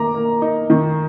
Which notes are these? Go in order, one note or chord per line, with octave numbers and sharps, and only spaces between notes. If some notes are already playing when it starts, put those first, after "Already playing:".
Already playing: D#3 A#3 A#5 D6
A#3
D#4
D#3